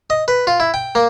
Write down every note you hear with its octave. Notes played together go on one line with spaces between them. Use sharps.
D#5
B4
F4
E4
G5
A#3